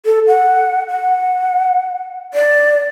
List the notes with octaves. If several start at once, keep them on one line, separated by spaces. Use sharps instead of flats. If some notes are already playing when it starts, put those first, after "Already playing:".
A4
F#5
F#5
D5